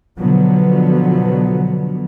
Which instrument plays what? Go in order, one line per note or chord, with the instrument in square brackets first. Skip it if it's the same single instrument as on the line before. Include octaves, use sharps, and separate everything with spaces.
[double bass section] B2 D3 F3 F#3 B3